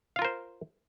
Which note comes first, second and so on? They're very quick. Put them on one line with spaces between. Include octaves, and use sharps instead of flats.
F5 F4 A#4 C5